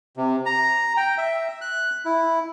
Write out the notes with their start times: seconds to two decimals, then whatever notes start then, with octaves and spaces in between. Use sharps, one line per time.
0.17 C3
0.46 A#5
0.97 G5
1.18 E5
1.61 F#6
2.05 E4